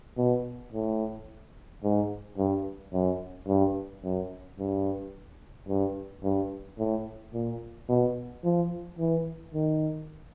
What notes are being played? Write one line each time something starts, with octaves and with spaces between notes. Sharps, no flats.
B2
A2
G#2
G2
F#2
G2
F#2
G2
G2
G2
A2
A#2
B2
F3
E3
D#3